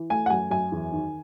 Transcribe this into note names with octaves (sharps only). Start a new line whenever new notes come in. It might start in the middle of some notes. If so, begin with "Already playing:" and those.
Already playing: E3
A3 G#5
F#5
F#2 G#5
F#2 G#5
E2
D#3